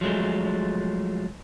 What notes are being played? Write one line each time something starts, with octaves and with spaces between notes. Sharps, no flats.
F3 F#3 G#3 A3